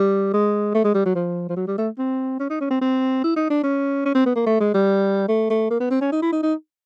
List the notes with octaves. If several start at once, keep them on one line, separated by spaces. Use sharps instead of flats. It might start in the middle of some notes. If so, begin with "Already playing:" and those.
Already playing: G3
G#3
A3
G#3
G3
F#3
F3
F3
F#3
G3
A3
C4
C#4
D#4
C#4
C4
C4
E4
D#4
D4
C#4
C#4
C4
B3
A#3
A3
G#3
G3
A3
A3
A#3
B3
C4
C#4
D#4
E4
D#4
D#4